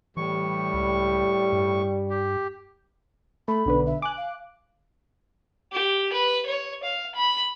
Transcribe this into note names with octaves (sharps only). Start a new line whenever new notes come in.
A2 E3 G3 C#6
C#2
G2
G4
A3 B5
B1 D3 B4
E5
G#5 D6 F#6
F5
G4
B4
C#5
F5
B5